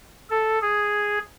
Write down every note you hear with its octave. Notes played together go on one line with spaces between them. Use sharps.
A4
G#4